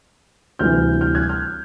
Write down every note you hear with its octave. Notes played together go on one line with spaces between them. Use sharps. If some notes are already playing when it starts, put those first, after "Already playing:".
D2 C3 E3 G3 F6 G6
F6 G6
F#6 G#6
F6 G6